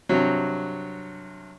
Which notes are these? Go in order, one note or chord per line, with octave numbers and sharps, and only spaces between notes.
G2 C3 F#3